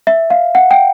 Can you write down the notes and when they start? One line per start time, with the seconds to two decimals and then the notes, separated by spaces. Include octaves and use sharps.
0.07 E5
0.30 F5
0.55 F#5
0.71 G5